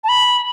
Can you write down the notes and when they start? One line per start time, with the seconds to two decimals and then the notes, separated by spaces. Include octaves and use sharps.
0.04 A5
0.09 B5